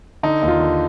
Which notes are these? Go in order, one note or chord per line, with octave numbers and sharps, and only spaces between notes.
D3 D#4
D#2
F4
D3